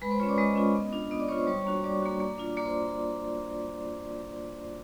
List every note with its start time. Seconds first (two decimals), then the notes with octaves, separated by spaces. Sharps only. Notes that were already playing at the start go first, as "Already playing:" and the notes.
0.02 G#3 B4 B5
0.10 C5 C6
0.20 F4 C#5 C#6
0.23 C#4
0.29 D5 D6
0.38 G#3 D#5 D#6
0.56 C#4 F4
0.75 B3
0.93 D4 F4
1.11 B3 D#5 D#6
1.20 D5 D6
1.28 D4 F4 C#5 C#6
1.38 C5 C6
1.47 G3 C#5 C#6
1.65 A#3 D4 F#4
1.84 G3 D5 D6
2.02 A#3 D4 F#4
2.20 A#3
2.38 D4 F4
2.57 A#3 D5 D6
2.65 C5 C6